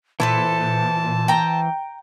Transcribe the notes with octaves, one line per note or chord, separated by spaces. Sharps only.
A#2 E3 E4 A4 B4 C5 A5
G5 A#5